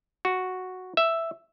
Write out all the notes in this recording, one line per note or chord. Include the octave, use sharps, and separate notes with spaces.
F#4
E5